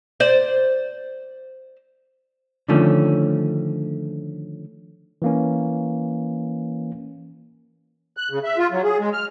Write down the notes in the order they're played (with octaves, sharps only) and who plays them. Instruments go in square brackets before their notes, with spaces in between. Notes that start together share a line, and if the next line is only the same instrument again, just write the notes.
[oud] C5 D5
[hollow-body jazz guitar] D3 D#3 F3 A3 C#4
[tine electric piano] E3 A#3 C#4
[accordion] F#6
C#3
E5
F4
F#3
G#4
G#3
F6